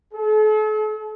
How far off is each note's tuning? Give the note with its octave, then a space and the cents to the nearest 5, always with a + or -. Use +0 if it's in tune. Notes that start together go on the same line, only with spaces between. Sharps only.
A4 -45